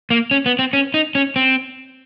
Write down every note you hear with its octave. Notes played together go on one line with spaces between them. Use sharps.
A#3
C#4
B3
C4
C#4
D#4
C#4
C4